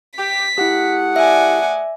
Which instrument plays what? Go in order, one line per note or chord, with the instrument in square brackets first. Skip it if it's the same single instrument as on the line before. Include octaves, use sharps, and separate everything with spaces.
[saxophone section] G4 [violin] B6
[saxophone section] A3 G#4 F#5 [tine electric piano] E4 G4
[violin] D5 G#5 [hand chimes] E5